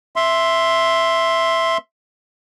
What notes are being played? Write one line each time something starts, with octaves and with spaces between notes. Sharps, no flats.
E5 C6